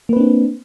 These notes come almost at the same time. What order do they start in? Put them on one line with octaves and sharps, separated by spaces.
A#3 B4 C4 D4